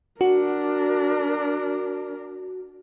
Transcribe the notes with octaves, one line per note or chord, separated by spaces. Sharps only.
D4 F#4 A#4